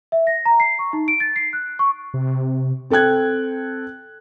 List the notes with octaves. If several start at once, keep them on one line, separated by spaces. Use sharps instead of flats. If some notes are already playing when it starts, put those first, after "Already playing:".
E5
A#6
A#5
C7
C#6
D#4
D7
A6
C7
F#6
C#6
C3
C4 A4 G5 F#6 G#6